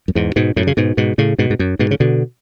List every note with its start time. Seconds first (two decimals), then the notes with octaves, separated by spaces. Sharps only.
0.08 F#2
0.15 E2 G#2
0.36 G#2 B2
0.56 F#2 A2
0.67 C#3
0.77 G#2 B2
0.97 G#2 B2
1.18 A2 C#3
1.38 G#2 B2
1.50 G#2
1.59 F#2
1.79 G#2 B2
1.91 C#3
2.00 B2 D3